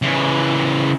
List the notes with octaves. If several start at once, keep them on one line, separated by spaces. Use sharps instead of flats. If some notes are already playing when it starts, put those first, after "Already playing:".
C#3 E3